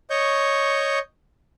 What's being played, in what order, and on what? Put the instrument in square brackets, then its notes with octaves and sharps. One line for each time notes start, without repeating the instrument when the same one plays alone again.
[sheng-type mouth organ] C#5 D#5 C#6 G6